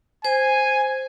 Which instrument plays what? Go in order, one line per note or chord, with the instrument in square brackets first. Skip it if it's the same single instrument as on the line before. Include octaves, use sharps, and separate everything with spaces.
[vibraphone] C5 [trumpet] G#5